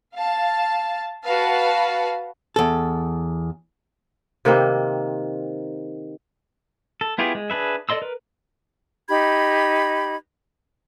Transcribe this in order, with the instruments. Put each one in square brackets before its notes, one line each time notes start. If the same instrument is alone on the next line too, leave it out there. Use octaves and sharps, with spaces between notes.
[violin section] F5 A5
F#4 B4 F5 A5
[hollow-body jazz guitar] E2 A4
[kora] C3 D#3 A#3 C4
[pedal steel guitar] A4
B3 E4 F4 G4 G#4
G#3
D4 G#4 B4 E5
A4 D5 D#5 C6 E6
A#4 B4
[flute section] D#4 G4 B5 G#6